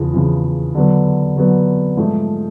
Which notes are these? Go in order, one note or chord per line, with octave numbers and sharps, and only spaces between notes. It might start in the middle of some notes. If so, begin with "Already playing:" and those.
Already playing: E2 C#3 F3
E2 C#3 F3
D3 F#3 B3
D3 F#3 B3
G#2 F3 A3